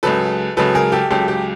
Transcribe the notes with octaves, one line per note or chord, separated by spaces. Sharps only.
C#2 C#3 F#3 A4 B4
C#2 C#3 F#3 A4 B4
G#4 A#4
G4 A4
C#2 C#3 F#3 G4 A4
G4